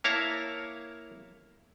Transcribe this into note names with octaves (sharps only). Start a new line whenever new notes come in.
A#3 E4 C#5 F5 A5 A#5